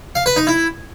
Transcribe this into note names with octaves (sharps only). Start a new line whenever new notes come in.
F5
B4
D#4
E4